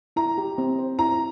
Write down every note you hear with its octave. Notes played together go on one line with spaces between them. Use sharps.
E4 A#5
G4
C4
C5
E4 A#5